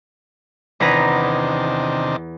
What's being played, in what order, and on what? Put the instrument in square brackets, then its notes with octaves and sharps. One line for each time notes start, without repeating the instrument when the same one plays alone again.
[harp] E2 B4 A#5 [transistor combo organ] C3 D#3 D4